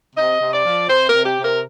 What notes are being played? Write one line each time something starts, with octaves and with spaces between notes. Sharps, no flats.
C3 D#5
C3
D5
F3
C3 C5
A#4
C3
G4
C3
A#4